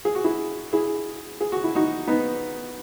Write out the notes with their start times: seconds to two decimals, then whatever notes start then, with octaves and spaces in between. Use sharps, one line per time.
0.05 G#4
0.15 F#4
0.24 E4 G#4
0.73 E4 G#4
1.41 G#4
1.52 F#4
1.64 E4
1.75 D#4 F#4
2.07 B3 D#4